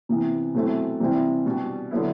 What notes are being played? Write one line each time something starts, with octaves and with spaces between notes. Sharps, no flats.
C3 E3 B3
B2 F#3 A3 C4 E4
C3 E3 G3 C4 E4
B2 G3 D4
D3 F#3 B3 E4